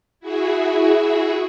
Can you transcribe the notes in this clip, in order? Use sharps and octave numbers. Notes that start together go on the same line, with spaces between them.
E4 F#4 G#4 E5